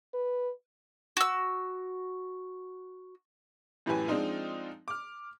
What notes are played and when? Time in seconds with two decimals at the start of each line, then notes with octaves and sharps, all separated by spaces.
0.14 B4
1.17 F#4 E6
3.86 F#2 A2 E3 G4 B4 G#5
4.08 F3 G#3 C4 D4 D#4 F4
4.88 D6 F6